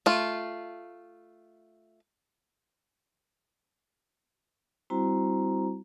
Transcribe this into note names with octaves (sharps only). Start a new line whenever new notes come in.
A3 F4
G3 C4 E4 F#4 C5 A#5